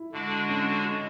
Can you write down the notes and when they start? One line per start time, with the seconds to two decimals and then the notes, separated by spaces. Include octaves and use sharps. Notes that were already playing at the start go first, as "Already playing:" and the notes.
Already playing: E4
0.12 D3 G#3 D4 F#4
0.49 C#4